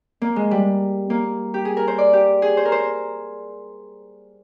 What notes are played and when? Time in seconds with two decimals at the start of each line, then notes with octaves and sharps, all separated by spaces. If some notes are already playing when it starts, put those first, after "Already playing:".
0.22 A#3
0.36 G#3
0.51 G3
1.10 A#3
1.54 G4
1.65 G#4
1.77 A#4
1.88 C5
1.98 D5
2.13 G4
2.42 G#4
2.57 C5
2.65 A#4
2.72 C5